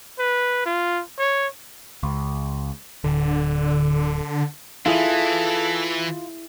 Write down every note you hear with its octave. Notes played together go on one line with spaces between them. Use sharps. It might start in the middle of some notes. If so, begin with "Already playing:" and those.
B4
F4
C#5
C#2
D1 D3
E3 E4 F4 G#4 A4 E5